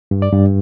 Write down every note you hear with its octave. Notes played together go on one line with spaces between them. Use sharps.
G2
D5
G2